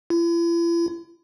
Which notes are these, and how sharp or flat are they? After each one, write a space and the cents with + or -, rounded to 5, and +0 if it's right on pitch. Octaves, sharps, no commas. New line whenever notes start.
E4 +45